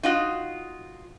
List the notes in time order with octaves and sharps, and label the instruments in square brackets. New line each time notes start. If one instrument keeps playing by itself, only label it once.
[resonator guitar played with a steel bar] D#4 F4 F#4